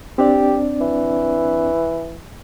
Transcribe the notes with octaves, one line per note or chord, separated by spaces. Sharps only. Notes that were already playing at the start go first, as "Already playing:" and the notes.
C4 D4 G4 D5
E3